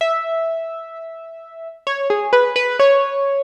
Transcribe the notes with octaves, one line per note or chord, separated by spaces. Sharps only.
E5
C#5
G#4
B4
B4
C#5